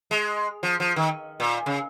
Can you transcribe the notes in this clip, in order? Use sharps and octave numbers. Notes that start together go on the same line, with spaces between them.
G#3
F3
F3
D#3
A#2
C#3